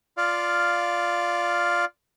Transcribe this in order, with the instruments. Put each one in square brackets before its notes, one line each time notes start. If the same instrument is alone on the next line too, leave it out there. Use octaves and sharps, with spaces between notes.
[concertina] F4 D5 F5